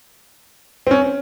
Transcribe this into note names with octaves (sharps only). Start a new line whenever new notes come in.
C4
C#4